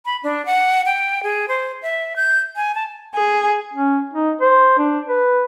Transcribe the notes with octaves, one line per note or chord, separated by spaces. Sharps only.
B5
D4
F#5
G5
G#4
C5
E5
G6
G#5
A5
G#4
C#4
D#4
C5
D4
B4